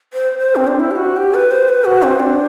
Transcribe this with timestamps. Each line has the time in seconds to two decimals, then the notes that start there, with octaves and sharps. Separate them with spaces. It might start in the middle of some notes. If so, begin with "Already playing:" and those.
0.13 C5
0.39 C5
0.56 C4
0.67 D4
0.80 E4
0.91 G4
0.96 F#4
1.17 G4
1.34 B4
1.51 C5
1.69 B4
1.85 F#4
2.03 C4
2.20 D4